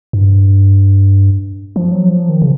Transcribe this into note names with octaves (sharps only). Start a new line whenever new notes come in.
G2
F3
F#3
F3
D#3
C#3